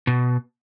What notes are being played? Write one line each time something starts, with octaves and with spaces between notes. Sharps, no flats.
B2